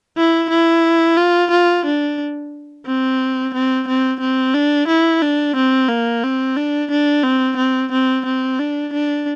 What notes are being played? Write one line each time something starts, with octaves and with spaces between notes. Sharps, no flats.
E4
E4
F4
F4
D4
C4
C4
C4
C4
D4
E4
D4
C4
A#3
C4
D4
D4
C4
C4
C4
C4
D4
D4